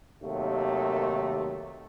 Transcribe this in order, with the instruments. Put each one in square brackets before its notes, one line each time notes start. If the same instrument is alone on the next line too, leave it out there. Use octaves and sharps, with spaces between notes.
[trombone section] D#2 C3 D#3 F#3 A3